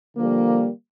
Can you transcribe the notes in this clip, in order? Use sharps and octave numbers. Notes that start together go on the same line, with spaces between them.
D3 F3 G3 A#3